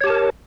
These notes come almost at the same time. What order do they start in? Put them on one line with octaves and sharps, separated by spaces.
C#5 G4 A5 A#4